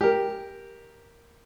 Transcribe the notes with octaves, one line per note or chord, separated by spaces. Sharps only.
G4 A#4